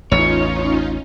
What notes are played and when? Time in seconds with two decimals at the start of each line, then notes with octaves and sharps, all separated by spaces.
0.12 A1 E2 C#4 D#4 F4 C#5